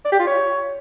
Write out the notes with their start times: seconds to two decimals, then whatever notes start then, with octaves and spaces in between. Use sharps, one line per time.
0.05 D5
0.12 G4
0.20 F4
0.27 C#5